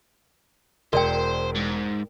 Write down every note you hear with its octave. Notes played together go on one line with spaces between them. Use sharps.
E1 A#4 C5 D5 G5
G#2